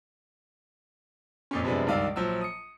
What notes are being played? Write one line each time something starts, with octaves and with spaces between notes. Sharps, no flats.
F2 A#2 C#4
F#2 C3 F3 G#3 B3 D4
C#2 G2 D#3 D5 F5 E6
A#1 F3 F#3 E6
D#6 C#7